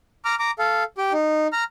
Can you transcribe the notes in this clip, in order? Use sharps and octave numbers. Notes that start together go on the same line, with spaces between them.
A#5 D6 F6
A#5 D6
A4 F5
G4 G5
D#4
A#5 F6